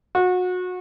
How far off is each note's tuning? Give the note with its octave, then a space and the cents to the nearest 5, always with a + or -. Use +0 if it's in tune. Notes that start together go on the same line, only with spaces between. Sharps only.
F#4 -30